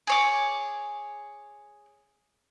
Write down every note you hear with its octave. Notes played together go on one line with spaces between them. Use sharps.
G#4 C#5 D6